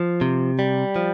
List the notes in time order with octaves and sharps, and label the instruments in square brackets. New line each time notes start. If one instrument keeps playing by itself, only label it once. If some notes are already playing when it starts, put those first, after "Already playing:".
Already playing: [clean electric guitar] F3
C3
G3
F3